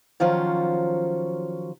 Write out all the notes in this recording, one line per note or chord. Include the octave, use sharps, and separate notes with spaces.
D#3 F3 F#3 C#4 F4 C5